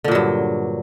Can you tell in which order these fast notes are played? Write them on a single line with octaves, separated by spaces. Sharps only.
D3 A#2 F#3 G2